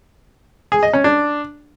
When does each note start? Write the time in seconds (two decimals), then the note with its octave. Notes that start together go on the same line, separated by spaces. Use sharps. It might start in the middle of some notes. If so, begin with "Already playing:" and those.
0.72 G#4
0.83 D#5
0.93 C#4
1.04 D4